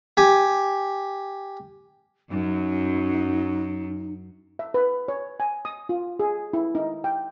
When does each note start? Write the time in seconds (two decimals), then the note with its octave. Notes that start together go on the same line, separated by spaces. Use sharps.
0.17 G4 G#5
2.31 F#2 D#4
4.59 E5
4.74 B4
5.08 C#5
5.40 G#5
5.65 D#6
5.89 F4
6.20 G#4
6.53 E4
6.75 D#4
7.04 G5